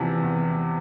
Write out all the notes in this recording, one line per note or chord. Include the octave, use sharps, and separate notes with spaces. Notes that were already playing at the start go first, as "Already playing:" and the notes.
Already playing: E2 C3 E3 F3
E2